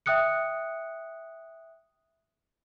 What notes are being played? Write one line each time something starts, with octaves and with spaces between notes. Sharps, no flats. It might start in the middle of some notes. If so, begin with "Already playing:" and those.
E5 G5 D#6 F#6 C#7